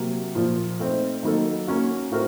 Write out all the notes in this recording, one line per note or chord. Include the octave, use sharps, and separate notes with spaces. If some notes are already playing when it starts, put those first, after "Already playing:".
Already playing: C3 F#3 A#3
A#2 F3 A#3 F4
A3 C4 D#4
D#3 F#3 A#3 D#4 A4
A#3 C#4 F#4
A2 A3 C4 F#4 A#4